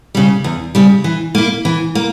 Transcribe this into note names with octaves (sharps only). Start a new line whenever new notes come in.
C#3 G3
E2
C#3 G3
E3
A#3 E4
E3
A#3